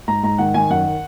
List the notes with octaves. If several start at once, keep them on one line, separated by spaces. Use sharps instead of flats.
G#2 A#5
G#2 A#5
D#3 F#5
D#3 G#5
F#2 F#5